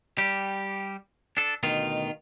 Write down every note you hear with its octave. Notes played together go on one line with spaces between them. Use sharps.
G3 G4
D4 A4
D2 B2 D#3 F4